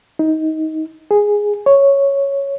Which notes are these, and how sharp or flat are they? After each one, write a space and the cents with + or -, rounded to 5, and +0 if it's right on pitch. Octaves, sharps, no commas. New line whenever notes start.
D#4 +20
G#4 -5
C#5 +0